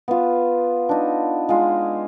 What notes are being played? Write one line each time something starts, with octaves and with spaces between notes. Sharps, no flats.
B3 F4
D4 D#4
G#3 F4